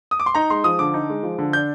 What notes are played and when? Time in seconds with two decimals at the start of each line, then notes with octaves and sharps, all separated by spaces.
0.11 D#6
0.20 D6
0.26 C6
0.35 D#4 A#5
0.50 G#3 C6
0.64 F3 D#6
0.79 D3 D6
0.94 D#4
1.10 G#3
1.23 F3
1.39 D3
1.53 D4 G6